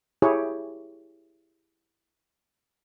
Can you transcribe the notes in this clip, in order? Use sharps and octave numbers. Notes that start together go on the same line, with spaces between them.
E4 G4 G#4 C#5